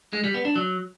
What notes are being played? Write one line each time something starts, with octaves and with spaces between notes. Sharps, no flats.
G#3
G3
B3
D4
F#3